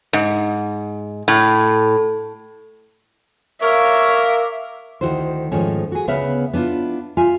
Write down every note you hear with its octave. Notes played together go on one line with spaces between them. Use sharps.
G#2
A2
A#4 C#5 E5 F5 D6
D2 D#3 E4 F#4 C5
G#2 D#3 F3 A3 C#4
F#4 G#4
D2 C#3 B3 B4 E5 F5
B3 D4 E4 F4
F4 E5 G#5